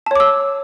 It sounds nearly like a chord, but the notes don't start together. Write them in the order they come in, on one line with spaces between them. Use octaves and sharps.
A5 C#5 D6 E6